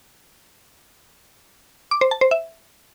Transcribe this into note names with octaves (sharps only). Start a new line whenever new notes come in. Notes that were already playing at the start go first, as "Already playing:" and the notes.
D6
C5
A5
C5
E5